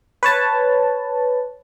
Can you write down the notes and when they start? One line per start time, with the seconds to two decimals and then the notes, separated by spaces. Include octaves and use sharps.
0.23 B4 C#5 A5